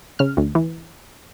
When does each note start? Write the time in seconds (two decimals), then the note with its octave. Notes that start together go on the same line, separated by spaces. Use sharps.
0.19 C#3 F6
0.37 D2
0.55 E3